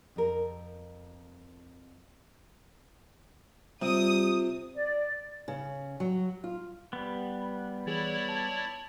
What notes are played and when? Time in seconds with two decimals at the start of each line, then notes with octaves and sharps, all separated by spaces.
0.16 F2 A#4
3.82 C3 G3 F4 D#6
4.74 D5
5.48 C#3
6.00 F#3
6.44 F4
6.93 G3 B3
7.86 E3 E4 G#4 C#5 D5
8.29 A5